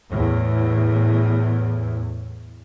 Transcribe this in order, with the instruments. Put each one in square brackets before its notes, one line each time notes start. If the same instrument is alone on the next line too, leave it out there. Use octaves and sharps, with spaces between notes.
[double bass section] E2 A2